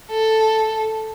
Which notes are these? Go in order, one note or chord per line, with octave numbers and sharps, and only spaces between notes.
A4